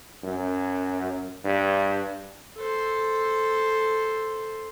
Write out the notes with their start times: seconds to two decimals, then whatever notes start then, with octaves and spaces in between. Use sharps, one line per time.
0.24 F#2
1.44 G2
2.57 A4 C5